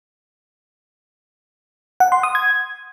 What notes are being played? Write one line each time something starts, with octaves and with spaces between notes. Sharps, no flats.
F#5
C6
D#6
G#6